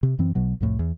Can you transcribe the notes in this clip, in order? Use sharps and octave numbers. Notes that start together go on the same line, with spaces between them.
C3
F#2 E3 C4
B1 B2 F#3
C2 F2 A2
E2